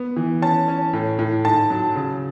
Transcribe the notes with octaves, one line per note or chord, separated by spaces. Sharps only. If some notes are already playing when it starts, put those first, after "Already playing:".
Already playing: B3
E3
C#4 A5
C#4
A2
A2
G#2 A5
F#3
C#3